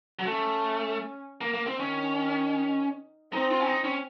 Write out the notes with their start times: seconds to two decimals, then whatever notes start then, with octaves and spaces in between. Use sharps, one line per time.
0.19 F#3
0.26 A3 C#4
1.41 A#3
1.54 A#3
1.67 C4
1.80 D#3 C#4
3.32 C4 D#4
3.51 F4
3.61 C#4
3.67 D#4
3.84 C#4